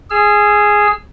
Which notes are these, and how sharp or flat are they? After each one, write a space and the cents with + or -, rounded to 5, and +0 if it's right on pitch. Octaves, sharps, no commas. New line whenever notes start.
G#4 +0 E6 +40